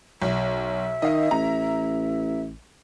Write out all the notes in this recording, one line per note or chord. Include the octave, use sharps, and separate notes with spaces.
B1 E5
D#3 D#5 F5
A1 A#5